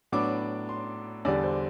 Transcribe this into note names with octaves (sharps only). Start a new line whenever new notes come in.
A2 F#3 B3 D4 D6
C6
E2 D3 G3 D4 D5
C5